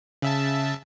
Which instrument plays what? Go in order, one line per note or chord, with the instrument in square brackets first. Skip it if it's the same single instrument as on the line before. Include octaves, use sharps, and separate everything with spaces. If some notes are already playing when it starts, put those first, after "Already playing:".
[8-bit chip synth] C#3 E5 A5